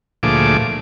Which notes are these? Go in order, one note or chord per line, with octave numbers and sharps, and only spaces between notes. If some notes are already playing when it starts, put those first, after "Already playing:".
D2 A#2 F3 A3 G#4 D6